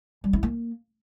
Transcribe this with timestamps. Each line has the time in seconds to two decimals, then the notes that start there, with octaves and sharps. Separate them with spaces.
0.24 G3
0.33 E4
0.43 A#3